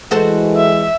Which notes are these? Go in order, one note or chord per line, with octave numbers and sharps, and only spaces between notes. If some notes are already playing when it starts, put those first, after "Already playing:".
E3 G#3 F#4 A4 C5
E5